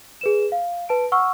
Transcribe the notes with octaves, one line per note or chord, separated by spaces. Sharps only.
G#4 B4 E7
F5
B4 A5 D7
F#5 C#6 E6 F6